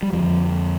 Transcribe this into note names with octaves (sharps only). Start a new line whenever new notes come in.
G3
F2 D3 F3